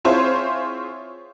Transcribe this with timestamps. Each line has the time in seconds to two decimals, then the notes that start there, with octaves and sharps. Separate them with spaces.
0.05 C4 E4 F4 G#4 C5 C#5